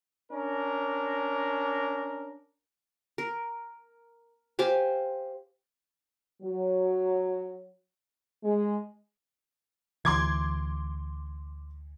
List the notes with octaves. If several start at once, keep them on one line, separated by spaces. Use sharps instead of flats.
C#4 D4 A#4
A#4
G4 C5 F5 G#5
F#3
G#3
D2 E3 C6 D6 G#6